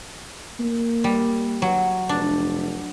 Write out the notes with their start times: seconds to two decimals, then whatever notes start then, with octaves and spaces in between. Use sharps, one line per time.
0.60 A#3
1.04 G3
1.62 F#3
2.09 F1 D4